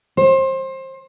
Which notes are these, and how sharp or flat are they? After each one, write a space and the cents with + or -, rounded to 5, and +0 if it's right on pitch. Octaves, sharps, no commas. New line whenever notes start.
C5 +25